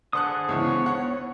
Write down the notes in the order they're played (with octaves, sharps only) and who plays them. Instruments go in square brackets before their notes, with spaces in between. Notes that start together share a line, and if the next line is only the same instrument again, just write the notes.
[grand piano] D3 A5 F#6 [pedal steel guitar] G#4 C5 D#6
[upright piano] C#2 E3 [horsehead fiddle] B3 C#5
[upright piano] F#5